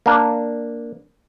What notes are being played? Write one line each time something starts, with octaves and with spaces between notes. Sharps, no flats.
A#3 D4